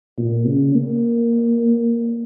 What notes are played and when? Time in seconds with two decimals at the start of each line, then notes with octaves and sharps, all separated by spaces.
0.18 A#2
0.47 C#3
0.75 A#3